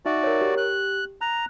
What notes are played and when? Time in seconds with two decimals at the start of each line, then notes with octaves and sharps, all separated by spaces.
0.05 D#4 F#4 D5 E5
0.24 A#4 C#5
0.41 G4
0.57 F#6
1.21 A#5 F#6